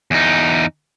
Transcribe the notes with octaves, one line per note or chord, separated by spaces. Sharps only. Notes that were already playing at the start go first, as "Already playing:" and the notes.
E2 D#4